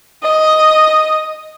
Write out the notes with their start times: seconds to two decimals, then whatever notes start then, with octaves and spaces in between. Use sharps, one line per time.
0.23 D#5